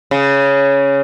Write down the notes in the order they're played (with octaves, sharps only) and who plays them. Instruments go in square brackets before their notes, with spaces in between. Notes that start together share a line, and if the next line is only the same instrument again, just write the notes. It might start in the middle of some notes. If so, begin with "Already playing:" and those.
[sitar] C#3